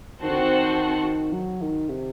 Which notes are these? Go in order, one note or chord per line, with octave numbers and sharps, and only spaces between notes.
D#3 C4 F#4 C5 F#5 A5
D3
D#3
F#3
D#3
C3